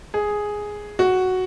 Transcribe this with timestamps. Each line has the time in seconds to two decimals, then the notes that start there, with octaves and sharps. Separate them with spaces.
0.14 G#4
0.99 F#4